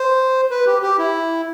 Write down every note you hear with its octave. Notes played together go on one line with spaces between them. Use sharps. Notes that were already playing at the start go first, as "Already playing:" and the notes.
Already playing: C5
B4
G4
G4
E4